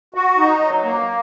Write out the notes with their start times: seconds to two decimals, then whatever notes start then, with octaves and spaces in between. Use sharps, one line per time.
0.14 F#4
0.38 D#4
0.61 F#3
0.84 A#3